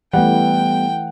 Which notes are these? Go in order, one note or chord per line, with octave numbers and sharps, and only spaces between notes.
E3 G3 A3 B3 F#5 G5